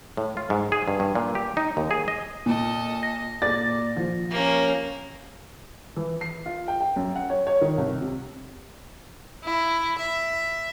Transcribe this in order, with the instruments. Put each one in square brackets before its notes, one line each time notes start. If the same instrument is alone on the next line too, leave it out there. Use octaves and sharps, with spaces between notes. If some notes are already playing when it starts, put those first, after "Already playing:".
[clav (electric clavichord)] A2
F4
G#2
G#4
G2
G2
A#2
G4
D#4
D#2
G#4
D#5
[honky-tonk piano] A#2 [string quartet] A4 D#5
[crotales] A#6
[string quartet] A#2 [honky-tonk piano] D5 A6
[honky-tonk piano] F3
[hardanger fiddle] A#3 C#4 [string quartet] G4
[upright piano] E3
C7
F4
G5
G5
F#2
F#5
C#5
C#5
D#3
C2
C3
[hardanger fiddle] E4
E5